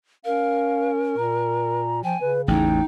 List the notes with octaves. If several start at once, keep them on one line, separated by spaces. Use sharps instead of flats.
C#4 A#4 F5
A#2 A#5
F3 G5 G#5
C#3 B4
A1 E2 D#4 G5